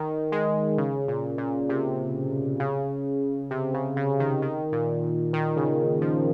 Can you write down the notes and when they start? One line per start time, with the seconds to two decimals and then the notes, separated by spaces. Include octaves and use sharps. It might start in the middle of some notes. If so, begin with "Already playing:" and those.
Already playing: D#3
0.32 G#3
0.78 C#3
1.08 A#2
1.38 A#2
1.69 C3
2.60 C#3
3.51 C3
3.74 C#3
3.97 C#3
4.20 D#3
4.42 D#3
4.72 A#2
5.33 D#3
5.57 C#3
6.01 F3